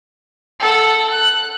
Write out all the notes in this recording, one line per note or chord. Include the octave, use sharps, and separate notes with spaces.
A4 F#5
F#6